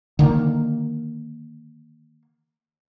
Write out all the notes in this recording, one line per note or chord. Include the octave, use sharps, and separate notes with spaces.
D3 D#3 G3 A#3